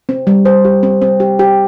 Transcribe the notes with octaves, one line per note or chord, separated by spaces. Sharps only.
C4
G3
C5
G4
C4
C4
G4
G4